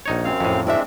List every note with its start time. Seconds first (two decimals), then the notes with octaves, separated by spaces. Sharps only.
0.06 A#1 D#4 C#5
0.25 F#2 C4 F5
0.40 F2 A2
0.67 G#3 C4 D4 E4 A#4 E5